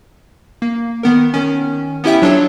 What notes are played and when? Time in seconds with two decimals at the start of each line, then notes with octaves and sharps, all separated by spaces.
0.62 A#3
1.03 D#3 B3 A#4
1.34 D#3 C#4
2.04 B3 C#4 E4 G4 E5 G5
2.22 F#3 D4 F4 A4 C#5